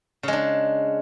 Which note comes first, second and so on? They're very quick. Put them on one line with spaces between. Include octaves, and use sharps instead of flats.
C#3 G#3 D4